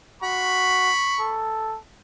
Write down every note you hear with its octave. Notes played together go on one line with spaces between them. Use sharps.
F#4 B5 C#6
A4